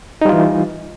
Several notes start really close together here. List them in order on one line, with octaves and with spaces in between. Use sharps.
D#4 G3 F4 E3